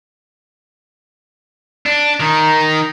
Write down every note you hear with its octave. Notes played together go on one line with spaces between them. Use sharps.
D4
D#3 D#4